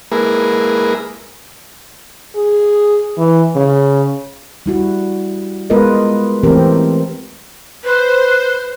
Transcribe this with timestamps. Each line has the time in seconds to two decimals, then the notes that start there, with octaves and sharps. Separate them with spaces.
0.12 G#3 A#3 E4 G#4 A#4 B4
2.36 G#4
3.19 E3
3.56 C#3
4.66 G3 E4 F#4
5.70 G#3 B3 F4 A#4 B4 D#5
6.43 E3 A3 C4 G4 A#4
7.84 B4 C5